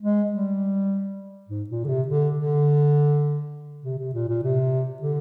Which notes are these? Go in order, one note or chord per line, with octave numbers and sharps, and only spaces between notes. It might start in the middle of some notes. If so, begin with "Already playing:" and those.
G#3
G3
G#2
A#2
D3
C3
D3
D3
C3
C3
A#2
A#2
C3
D3